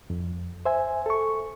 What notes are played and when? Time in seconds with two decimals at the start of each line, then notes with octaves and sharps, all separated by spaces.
0.10 F2
0.66 C5 E5 G#5
1.06 A4 C#6